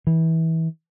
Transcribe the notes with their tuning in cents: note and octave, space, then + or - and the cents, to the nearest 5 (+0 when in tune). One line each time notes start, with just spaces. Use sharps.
E3 -25